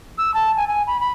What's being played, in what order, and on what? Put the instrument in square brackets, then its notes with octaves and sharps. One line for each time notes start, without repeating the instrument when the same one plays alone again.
[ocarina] E6
A5
G#5
G#5
B5
B5